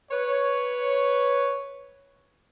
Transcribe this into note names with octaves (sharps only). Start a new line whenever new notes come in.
B4 C#5